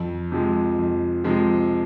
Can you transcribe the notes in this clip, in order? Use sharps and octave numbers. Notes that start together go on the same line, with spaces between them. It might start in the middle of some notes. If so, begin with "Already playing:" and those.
Already playing: F2
C3 F3 G#3
F2
C3 F3 G#3